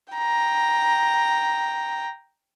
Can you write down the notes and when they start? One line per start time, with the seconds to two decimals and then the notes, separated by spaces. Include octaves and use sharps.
0.14 G5 A#5